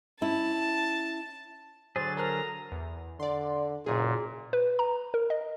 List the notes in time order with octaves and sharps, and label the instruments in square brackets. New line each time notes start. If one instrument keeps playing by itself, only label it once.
[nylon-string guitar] C#4 E4 [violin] A5
[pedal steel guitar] D3 F#3 G#4 [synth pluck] C5 [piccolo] A6
[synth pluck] A4 A#4 F6 [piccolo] A#5
[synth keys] E2
[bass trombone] D3 [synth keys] D5 C6
[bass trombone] F#1 [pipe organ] A#2 [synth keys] G#4
[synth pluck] B4
A#5
A#4
D#5